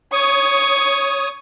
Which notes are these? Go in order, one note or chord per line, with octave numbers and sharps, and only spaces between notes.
C#5 C#6 D#6